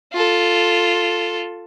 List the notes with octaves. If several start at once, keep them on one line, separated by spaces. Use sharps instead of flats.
F4 A4